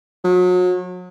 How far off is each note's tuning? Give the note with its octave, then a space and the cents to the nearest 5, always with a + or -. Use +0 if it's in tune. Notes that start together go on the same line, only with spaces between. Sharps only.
F#3 -35